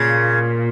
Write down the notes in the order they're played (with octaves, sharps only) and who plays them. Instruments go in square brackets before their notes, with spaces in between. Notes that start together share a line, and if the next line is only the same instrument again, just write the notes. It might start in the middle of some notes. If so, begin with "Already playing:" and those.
Already playing: [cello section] A#2 [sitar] C#3